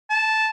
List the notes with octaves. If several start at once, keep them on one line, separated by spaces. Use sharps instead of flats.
A5